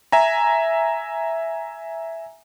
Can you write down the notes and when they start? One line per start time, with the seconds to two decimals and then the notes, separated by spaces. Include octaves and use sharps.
0.12 E5 G#5 A#5